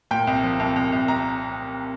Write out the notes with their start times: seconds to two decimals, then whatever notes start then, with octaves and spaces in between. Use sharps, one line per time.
0.11 A#2 G5
0.27 C2
0.43 F3
0.60 C2
0.76 C2
0.92 C2
1.08 C2 A#5